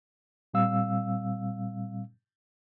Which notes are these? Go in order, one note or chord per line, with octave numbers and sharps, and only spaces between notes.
A#2 G3 C4 F5 E6